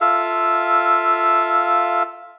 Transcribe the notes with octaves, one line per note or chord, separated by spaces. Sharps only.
F4 A4 E5 F5